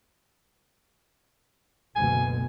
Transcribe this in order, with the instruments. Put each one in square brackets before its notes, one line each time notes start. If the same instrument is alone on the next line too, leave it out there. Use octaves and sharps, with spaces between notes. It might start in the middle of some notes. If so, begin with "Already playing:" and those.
[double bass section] F#1 D2 B2 [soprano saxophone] G#5